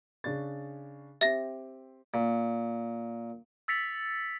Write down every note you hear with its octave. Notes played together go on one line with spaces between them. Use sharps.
C#3 D4 A6
C4 G4 E5 A#6
A#2
E6 A6 B6 C#7 F7